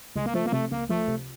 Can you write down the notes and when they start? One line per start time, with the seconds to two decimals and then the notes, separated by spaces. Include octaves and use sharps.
0.16 C#2 G#3
0.26 A#3
0.34 F3 A3
0.46 A#3
0.52 C3 A3
0.71 C#2 A#3
0.89 F3 A3
1.08 C3